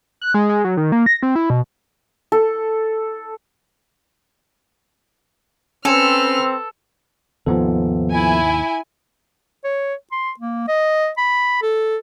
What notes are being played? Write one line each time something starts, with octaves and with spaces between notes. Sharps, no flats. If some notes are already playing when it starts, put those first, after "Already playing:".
F#6
G#3
G#3
F#3
D#3
A#3
A#6
C4
E4
B2
A4
C4 C#4 A4 B4 G#5 F6
D#2 G#2 C3 F3 B3 A4
E4 G#5
C#5
C6
A#3
D#5
B5
A4